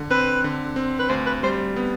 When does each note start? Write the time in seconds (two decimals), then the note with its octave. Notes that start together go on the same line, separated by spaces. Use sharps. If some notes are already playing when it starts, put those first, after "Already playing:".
Already playing: D3
0.10 C4 B4
0.44 D3
0.76 C4
0.99 B4
1.09 D2 C5
1.27 B4
1.43 G3 C5
1.76 B3